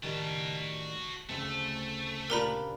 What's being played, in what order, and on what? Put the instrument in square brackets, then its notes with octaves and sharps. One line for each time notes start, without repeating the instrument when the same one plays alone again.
[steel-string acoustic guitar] A2 D#3 G3 [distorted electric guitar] F#4 A5
[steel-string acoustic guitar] D2 C#3 C4 [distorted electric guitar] A3
[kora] A#2 D4 G4 [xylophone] A#4 A#5 B5